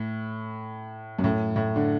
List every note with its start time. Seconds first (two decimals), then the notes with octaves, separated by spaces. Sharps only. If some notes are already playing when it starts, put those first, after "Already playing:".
Already playing: A2
1.19 F#2
1.24 A2
1.56 A2
1.76 D3